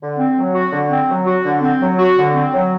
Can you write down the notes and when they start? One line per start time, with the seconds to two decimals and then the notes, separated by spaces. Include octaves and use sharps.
0.01 D3
0.18 C4
0.37 F#3
0.54 F#4
0.72 D3
0.91 C4
1.09 F#3
1.27 F#4
1.44 D3
1.62 C4
1.80 F#3
1.99 F#4
2.17 D3
2.35 C4
2.52 F#3